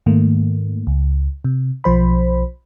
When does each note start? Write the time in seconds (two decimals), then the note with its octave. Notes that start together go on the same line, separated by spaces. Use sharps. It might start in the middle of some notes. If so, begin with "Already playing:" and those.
0.06 G#2 D#3 A3 A#3
0.87 C#2
1.44 C3
1.84 B1 F3 C5 B5